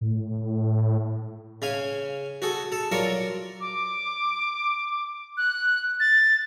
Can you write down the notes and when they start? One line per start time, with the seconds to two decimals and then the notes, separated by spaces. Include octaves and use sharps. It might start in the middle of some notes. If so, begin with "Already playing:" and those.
0.01 A2
1.62 C#3 F5 G#5
2.42 F#4 G#4 A4
2.72 A4 A5
2.92 F#3 F4 A#4 D5 C#6
3.61 D6
5.37 F#6
6.00 A6